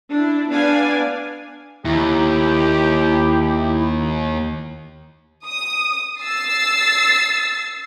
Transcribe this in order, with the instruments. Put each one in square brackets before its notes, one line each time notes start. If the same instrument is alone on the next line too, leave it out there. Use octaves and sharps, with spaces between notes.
[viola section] D4 E4
B3 D4 D5 F5 G#5
[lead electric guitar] D#2 [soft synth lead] E4 [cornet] G4
[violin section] D#6
E6 A6 C7